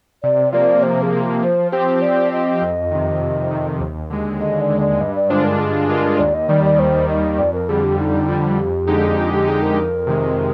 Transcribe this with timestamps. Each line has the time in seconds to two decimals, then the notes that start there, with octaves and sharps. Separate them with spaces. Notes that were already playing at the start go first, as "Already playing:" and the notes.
0.23 C3 D5
0.52 F3 A#3 D5
0.82 C3 C5
1.02 G#4
1.13 F3 A#3
1.43 F3 C5
1.72 C4 G4 C5
2.02 F3 D5
2.32 C4 G4 D#5
2.62 F2
2.91 C3 D#3
3.21 F2
3.50 C3 D#3
3.80 D#2
4.10 D3 G#3
4.40 D#2 D#5
4.61 D5
4.70 D3 G#3
4.80 D5
5.00 G2 D#5
5.15 D5
5.30 D3 G#3 D4 F4 C5
5.45 A#4
5.59 G2 G#4
5.89 D3 G#3 D4 F4 A#4
6.19 D#2 D5
6.34 D#5
6.49 D#3 G3 D5
6.64 D5
6.79 D#2 C5
7.08 D#3 G3 D#5
7.38 F2 D5
7.53 A#4
7.69 D3 G3 G#4
7.84 G4
7.98 F2 D#4
8.28 D3 G3 F4
8.58 F2 G4
8.87 D3 G#3 D#4 G4 G#4
9.17 F2 F4
9.33 G4
9.47 D3 G#3 D#4 G4 G#4
9.62 A#4
9.77 F2
10.07 C3 D#3 G#3